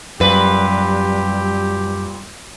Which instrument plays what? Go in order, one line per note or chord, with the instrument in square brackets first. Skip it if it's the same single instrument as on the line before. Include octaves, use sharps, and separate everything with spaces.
[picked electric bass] F#2 [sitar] A#2 B4 [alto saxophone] G3 [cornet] G4